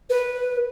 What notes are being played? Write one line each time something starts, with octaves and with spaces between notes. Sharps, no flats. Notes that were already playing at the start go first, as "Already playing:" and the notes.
B4